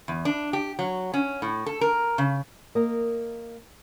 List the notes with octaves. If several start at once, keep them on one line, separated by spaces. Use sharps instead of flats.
E2
D4
G4
F#3
C#4
A2
A4
A#4
C#3
A#3 A#4 D#5